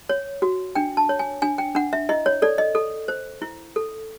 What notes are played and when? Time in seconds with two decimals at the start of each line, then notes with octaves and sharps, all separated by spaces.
0.09 C#5
0.42 F#4
0.75 D4 G5
0.97 A5
1.09 C#5
1.19 G#5
1.42 D4 G#5
1.58 G5
1.75 D4 F#5
1.93 E5
2.09 E4 D#5
2.26 C#5
2.42 A4 D5
2.58 D#5
2.75 A4
3.08 C5
3.42 E4
3.76 A4